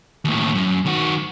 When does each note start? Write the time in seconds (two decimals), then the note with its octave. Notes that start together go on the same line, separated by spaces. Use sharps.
0.25 D#2 A2
0.55 F#2
0.86 D#3 F#4